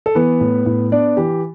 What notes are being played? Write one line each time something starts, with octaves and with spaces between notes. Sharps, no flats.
A4
E3 B3 B4
A2
A2
B3 D4 D5
E3 G4